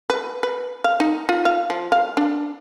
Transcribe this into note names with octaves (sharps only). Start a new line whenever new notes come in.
B4
B4
F5
D#4
F4
F5
F3
F5
D4